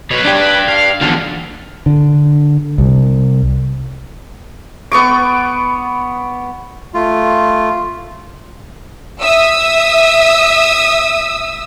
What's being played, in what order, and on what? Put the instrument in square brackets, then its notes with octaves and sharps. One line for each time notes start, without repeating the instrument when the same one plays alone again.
[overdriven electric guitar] B2 [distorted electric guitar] B4 C#5
[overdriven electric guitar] D4 G4
[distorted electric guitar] B4
F5
[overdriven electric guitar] E2 D3 [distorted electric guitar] F4 A4
[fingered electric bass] D3
C2
[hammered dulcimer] B3 C#6 D6
[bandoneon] A3 F4
[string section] E5 D#6 E6